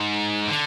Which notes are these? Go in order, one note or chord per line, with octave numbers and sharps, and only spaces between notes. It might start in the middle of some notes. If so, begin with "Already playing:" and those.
Already playing: G#2
D3